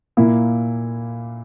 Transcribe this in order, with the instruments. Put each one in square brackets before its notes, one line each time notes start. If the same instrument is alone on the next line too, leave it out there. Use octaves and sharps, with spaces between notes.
[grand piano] A#2 A#3 E4